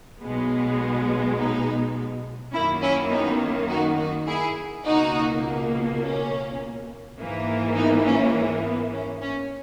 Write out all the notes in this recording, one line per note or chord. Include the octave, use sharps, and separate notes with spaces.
B1 B2 G#3 B3
B3 D#4
F#2 D#3 A#3 C#4 E4
C#4 E4
B3 D#4
D#4 F#4
D#4 F#4
E4 G#4
C#2 B2 A#3 D#4 F#4
C#4
G#2 E3 A#3
B3 D#4
C#4
B3
C#4
C#4